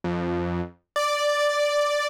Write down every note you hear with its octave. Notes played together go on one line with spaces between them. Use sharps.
F2
D5